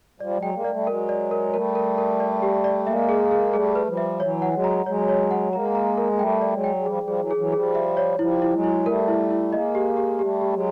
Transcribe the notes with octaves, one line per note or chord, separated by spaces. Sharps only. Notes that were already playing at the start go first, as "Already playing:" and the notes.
F3 G3 D5
F#3 G#3
G5
G#3 A#3
G#3 D5
G3 A3
F#3 G#3 A#4
D5
A#4
G3 A3 A#4
A#4
A#4
D5
G4
D5
G#3 A#3 E5
G#4
G#4
G3 A3 G#4
B4
F3 G3
E5
E3 F#3 C#5
F#5
F#3 G#3
A#5
F#3 G#3 C#5
C#5
F#5
G#3 A#3 A#5
A#5
A#4
A#3
G3 A3 G5
D5
F#3 G#3
G5
G#3
F3 G3 G#4
F3 G3 G#4
E3 F#3
G#4
E3 F#3
F3 G3 G#4
E5
C#5
F3 G3 E4
E4
F#3 G#3
E4
G3 A3 A#4
E4
E4
G#3 A#3 D#5
G4
G4
G3 A3 G4
G4
F#3 G#3